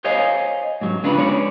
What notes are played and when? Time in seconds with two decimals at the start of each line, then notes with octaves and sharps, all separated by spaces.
0.04 C5 C#5 D#5 F5 G#5
0.81 G#2 F#3
1.04 C#3 D4 F4 B4
1.18 G#3 C#5 D5